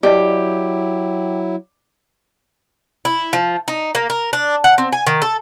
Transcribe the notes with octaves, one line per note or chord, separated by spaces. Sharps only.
F#3 E4 G4 D5 D#5 A5
E4
F3
D#4
A#3
A#4
D4
F#5
C4
G#5
D#3
A4